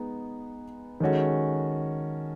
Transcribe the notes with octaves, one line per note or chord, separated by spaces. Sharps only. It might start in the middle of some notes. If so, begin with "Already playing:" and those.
Already playing: G#3 B3 D#4
D#3 G#3 C#4 F#4 A4